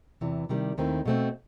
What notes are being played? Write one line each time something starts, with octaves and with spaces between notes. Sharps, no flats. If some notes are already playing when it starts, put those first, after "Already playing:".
E2 C3 E3
C3 D#3 G3
D#2 D#3 A3 C4 E4
B2 A3 C4